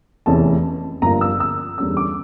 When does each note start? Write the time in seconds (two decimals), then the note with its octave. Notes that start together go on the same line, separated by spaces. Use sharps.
0.26 F1 E2 E3 A3 C#4 A5
1.02 G1 G2 F3 A#3 A#5
1.21 E6
1.40 E6
1.78 E2 D3 G3 C#4 E6
1.97 D6